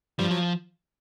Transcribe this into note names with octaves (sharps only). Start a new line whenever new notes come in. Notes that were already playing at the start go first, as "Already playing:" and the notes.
G2 F3 G3
F#3